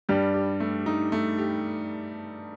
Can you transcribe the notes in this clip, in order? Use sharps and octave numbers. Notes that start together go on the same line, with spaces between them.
G2 G3 G4
G4
A3
D#4
A3
G4